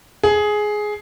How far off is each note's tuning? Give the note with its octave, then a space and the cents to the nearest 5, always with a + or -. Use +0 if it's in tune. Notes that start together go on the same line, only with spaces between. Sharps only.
G#4 +10